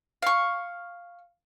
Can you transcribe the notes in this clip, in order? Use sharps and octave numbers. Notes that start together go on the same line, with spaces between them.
F5 C#6